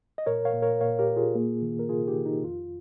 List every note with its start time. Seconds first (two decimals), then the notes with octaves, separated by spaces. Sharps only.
0.18 D#5
0.26 A#2 A#4 C#5
0.45 C#5 F5
0.53 A#2
0.62 A#4 C#5
0.81 A#2 C#5 F5
0.99 G4 A#4
1.08 A#2
1.16 F4 G#4
1.35 A#3
1.62 D#3
1.79 A#4
1.89 C3 F4 G#4
2.08 D#4 G4
2.16 D#3
2.26 D#4
2.43 F2 F4